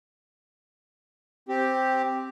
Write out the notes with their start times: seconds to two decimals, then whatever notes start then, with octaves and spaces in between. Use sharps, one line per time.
1.49 C4 G4